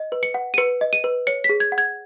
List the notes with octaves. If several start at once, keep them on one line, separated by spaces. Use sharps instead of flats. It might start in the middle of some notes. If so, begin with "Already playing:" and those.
Already playing: D#5
B4
C#7
F#5
D#7
B4 C#7
D#5
D#7
B4
C#5 C#7
B6
G#4
G#6
F#5
G#6